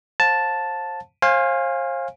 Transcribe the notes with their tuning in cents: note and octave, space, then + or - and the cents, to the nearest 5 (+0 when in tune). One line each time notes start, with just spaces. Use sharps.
C5 +30 F5 +30 A5 +0
C5 +40 F5 +0 G#5 -20